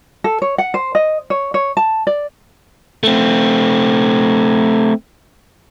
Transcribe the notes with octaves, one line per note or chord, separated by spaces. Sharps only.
A4
C#5
F#5
C5
D#5
C#5
C#5
A5
D5
A3 C4